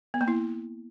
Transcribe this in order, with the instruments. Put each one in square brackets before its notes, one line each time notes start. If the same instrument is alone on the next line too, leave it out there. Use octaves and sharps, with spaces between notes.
[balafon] B3
A#3
E4